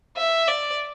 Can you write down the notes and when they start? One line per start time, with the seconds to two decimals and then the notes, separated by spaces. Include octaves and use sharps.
0.17 E5
0.47 D5